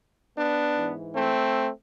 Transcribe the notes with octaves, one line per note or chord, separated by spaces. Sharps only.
B3 D4
G#2 E3
A3 C4